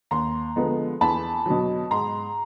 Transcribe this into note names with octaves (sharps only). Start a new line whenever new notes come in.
D#2 A#5 C6
D3 F3 G#3 B3
E2 A5 B5
B2 F#3
G#2 A#5 C6